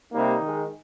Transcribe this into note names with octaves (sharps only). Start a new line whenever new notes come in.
C3 G3 A#3 D#4
D#3 G#3